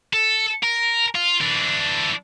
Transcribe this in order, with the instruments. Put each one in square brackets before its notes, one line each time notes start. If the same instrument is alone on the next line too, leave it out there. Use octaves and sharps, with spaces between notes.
[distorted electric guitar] A4
A#4
F4
E3 D4